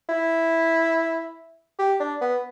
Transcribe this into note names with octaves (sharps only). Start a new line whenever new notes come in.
E4
G4
D4
B3